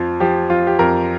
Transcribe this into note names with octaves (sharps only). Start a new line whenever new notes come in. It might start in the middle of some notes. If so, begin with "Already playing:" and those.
Already playing: F2 F3
F3 G4
F3 F4
G4
F2 A#4